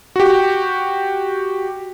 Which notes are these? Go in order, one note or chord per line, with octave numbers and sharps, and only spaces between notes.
F#4 G4